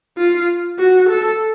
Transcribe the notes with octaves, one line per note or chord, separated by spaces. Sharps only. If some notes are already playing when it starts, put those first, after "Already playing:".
F4
F#4
A4